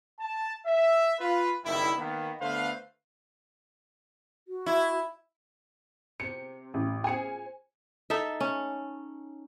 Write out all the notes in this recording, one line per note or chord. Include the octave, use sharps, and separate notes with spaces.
A5
E5
F4 B4
F#1 G2 D#3 G3 E4
D#3 A#3 B3
D3 A3 B3 B4 C5 F5
F#4
E4
C3 C#7
A1
F4 G#4 C5 G#5 C#7
D#4 A4 E5
C#4